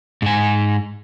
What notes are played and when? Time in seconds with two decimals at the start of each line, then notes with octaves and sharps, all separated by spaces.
0.22 G#2 G#5